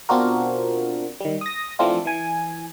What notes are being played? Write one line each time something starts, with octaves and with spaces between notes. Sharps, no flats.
B2 C4 D4 F4 F#4 A#4
D#3 G3
D#6 A#6
E3 F3 A3 C4 D4 F4
E3 G#5